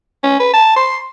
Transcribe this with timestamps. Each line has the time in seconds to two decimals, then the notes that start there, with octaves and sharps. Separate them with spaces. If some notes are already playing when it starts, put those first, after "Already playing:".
0.23 C#4
0.40 B4
0.54 A5
0.76 C6